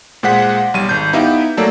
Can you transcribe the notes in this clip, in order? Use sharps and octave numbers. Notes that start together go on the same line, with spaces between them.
A#2 G#3 C5 F#5 B6
B1 G3 D#7
G#1 G6
B3 D#4 E4 G4 E5 F5
F#3 A3 A#3 A4 D5